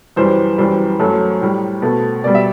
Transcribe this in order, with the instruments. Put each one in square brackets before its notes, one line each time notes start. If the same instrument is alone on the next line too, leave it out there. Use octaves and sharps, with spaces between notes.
[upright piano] F#2 E3 G3 C5
F#2 E3 G3 C5
F#2 F#3 A3
A2 G3
B2 A3
B2 G3 D5
E5